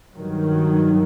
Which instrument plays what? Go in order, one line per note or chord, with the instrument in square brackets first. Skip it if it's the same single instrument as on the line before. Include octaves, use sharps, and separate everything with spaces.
[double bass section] G2 D#3 F#3